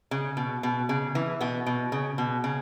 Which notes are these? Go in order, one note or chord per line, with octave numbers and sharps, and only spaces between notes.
C#3
B2
B2
C#3
E3
B2 B3
B2
C#3
B2
C#3